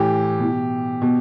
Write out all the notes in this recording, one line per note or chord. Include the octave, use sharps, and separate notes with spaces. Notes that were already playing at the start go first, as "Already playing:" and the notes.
Already playing: A2 E3 G4
B2
B2